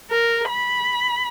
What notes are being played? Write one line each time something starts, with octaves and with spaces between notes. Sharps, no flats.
A#4
B5